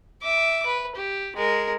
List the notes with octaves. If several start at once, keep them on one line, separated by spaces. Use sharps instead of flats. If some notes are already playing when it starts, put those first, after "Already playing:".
E5 D6
B4
G4
G#3 A#4